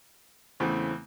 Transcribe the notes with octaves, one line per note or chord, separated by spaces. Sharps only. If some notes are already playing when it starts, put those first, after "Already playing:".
E2 C#3 E3 A3 C4